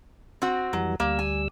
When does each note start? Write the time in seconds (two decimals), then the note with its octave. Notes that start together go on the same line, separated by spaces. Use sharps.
0.42 C4 F#4
0.73 F2 E3 F#3 G3
1.00 D2 G3 A#3 E6
1.19 G#5